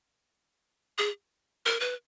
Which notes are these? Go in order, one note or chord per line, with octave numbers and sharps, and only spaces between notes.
G#4
A#4
B4